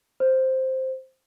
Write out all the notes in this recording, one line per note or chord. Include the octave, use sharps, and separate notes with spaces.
C5